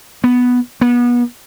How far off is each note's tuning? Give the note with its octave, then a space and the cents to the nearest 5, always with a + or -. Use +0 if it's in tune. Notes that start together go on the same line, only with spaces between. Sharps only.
B3 +0
B3 -30